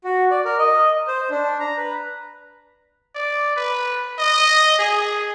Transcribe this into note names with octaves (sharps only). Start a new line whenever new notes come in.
F#4
D5
A#4
D#5
C5
D4
A#5
B4
D5
B4
D#5
G#4